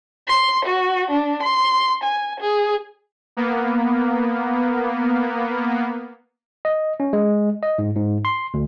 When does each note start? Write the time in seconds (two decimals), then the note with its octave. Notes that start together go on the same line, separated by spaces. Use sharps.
0.28 C6
0.65 F#4
1.10 D4
1.42 C6
2.03 G#5
2.40 G#4
3.37 A#3 B3
6.65 D#5
7.00 C#4
7.13 G#3
7.63 D#5
7.78 G#2
7.96 G#2
8.25 C6
8.54 D2